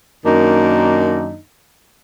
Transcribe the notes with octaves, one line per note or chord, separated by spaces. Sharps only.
F#2 D#3 A#3 D4 D#4